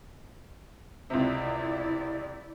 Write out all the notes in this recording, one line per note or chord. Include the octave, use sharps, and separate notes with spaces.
C#2 C3 E4 D5